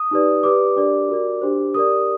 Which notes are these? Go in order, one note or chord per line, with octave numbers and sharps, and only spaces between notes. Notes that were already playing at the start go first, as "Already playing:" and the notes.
Already playing: D#6
D#4 G4 B4 D5
G4 B4 D5 D6
D4 G4 A#4 D5
F#4 A#4 D5
D4 G4 C5
G4 A#4 D5 D#6